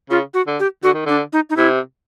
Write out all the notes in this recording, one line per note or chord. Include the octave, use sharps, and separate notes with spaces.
C#3 F4
F#4
D3
G4
D3 F#4
D#3
D3 D4
D#4
D#4
C3 E4